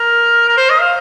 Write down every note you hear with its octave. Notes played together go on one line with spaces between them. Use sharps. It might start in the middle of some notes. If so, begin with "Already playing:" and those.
Already playing: A#4
A#4
C5
D#5
F5